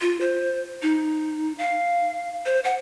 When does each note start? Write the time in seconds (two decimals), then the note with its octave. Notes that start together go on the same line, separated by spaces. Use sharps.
0.01 F4
0.21 C5
0.82 D#4
1.58 F5
2.46 C5
2.64 F#5